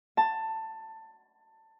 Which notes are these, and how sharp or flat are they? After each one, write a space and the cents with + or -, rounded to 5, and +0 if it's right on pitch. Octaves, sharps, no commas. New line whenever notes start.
A5 +15